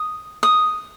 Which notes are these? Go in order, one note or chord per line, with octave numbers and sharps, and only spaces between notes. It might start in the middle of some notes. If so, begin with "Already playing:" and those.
Already playing: D#6
D#6